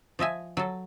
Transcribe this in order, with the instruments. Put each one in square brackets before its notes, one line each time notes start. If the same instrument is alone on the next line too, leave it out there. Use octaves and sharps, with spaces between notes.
[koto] F3 D#5 E5 G#5
F#3 A4